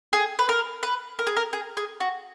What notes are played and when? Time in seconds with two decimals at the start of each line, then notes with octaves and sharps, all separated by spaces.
0.13 G#4
0.39 B4
0.49 A#4
0.83 B4
1.19 A#4
1.27 G#4
1.37 A#4
1.53 G#4
1.77 G#4
2.00 F#4